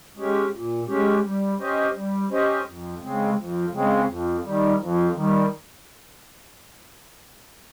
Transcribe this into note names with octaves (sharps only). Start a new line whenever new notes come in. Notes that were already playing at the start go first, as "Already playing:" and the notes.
G#3 C#4 G4
A#2
G#3 C#4 G4
G3
C#4 G4 C5 D#5
G3
C#4 G4 C5 D#5
F2
C#3 G#3 C4
F2
C#3 G#3 C4
F2
D#3 G3
F2
D#3 G3